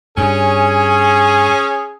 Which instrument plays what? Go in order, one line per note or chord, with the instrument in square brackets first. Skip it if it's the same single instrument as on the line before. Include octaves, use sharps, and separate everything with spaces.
[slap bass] G2 [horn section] C#4 [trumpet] G#4